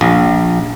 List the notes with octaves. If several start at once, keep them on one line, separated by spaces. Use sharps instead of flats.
A#1